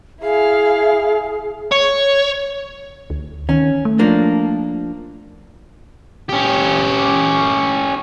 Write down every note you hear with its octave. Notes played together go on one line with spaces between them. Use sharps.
E4 G#4 F5
C#5
D2
D#3 C#4
A3
F3 A#3 D4
C#4 G4